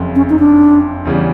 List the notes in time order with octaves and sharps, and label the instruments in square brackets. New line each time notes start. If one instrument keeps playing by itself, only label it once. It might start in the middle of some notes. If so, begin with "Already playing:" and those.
Already playing: [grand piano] F#1 F2 C#3
[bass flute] C#4
D#4
D4
[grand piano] E2 C#3 E3 G3